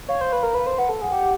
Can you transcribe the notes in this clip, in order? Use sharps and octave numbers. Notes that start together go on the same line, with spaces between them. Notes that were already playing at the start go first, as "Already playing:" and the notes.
C#5 F5
C5
B4
A#4
B4
C5
B4 F#5
A4
G#4 F#5
G4